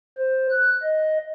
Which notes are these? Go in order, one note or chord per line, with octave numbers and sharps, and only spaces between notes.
C5
F#6
D#5